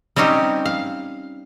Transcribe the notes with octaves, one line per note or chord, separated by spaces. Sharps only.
G3 C4 C#4 D#4 G4
F5